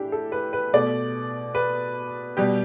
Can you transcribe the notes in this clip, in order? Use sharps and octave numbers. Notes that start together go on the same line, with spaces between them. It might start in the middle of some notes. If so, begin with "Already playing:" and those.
Already playing: A2 E3 D4 E4 G4
A4
B4
B4
B2 A3 D5
B4
B2 G3 G4